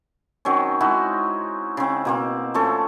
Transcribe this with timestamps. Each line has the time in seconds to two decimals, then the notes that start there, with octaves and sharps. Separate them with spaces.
0.45 D#3 F#3 C4 C#4
0.80 G#3 D#4 E4 F#4
1.77 C#3 C4
2.05 B2 A#3 C4
2.54 F3 A3 C#4 A4